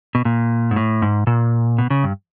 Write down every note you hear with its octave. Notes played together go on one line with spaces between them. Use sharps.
B2
A#2
G#2
A2
G#2
A#2
B2
C#3
G2